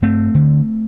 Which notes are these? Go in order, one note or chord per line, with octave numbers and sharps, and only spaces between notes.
G2 A3 C4
D3